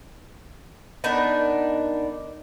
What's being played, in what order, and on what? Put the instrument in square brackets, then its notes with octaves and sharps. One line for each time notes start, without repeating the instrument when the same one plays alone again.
[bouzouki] B3 D4 D#4 A#4